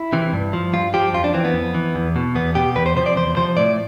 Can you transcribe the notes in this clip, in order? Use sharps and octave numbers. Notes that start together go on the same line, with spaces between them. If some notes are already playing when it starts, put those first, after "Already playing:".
Already playing: E4
C3 E3
G2
F3
G2 F4
F3 G4
F2 F4
D4
E3 C4
B3
F2
E3
E2
B2
E2 B3
B2 G4
E2 B4
C5
C3 F3 C5
D5
E2 C5
C3 F3 C5
A2 D5